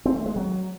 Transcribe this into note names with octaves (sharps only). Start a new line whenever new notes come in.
C4
A3
G#3
F#3